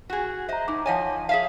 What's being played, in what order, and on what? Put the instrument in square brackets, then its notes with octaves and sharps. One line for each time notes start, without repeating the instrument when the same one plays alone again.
[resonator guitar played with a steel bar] F#4 G#4
[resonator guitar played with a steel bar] C5 D#5 [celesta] E5 A#5
[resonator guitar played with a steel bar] A2 [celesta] D#4 D6
[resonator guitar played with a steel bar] F3 D#5 G#5 [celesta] C#5 F#5 A5
[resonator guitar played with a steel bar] G#4 E5 F5